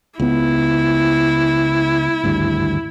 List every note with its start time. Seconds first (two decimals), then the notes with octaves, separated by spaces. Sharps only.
0.20 C#2 B3 E4
2.23 G#1 D2 G2